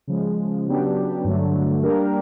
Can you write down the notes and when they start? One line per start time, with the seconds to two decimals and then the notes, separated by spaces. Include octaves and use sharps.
0.07 C#3 F3 G#3
0.67 C#3 F#3 B3 D4 G4
1.24 G2 D3 F#3 A3
1.83 G3 A#3 D4 G4 A#4